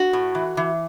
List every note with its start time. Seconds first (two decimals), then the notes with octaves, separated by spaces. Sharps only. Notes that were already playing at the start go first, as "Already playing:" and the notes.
Already playing: F#4
0.13 A2
0.35 E3
0.57 E3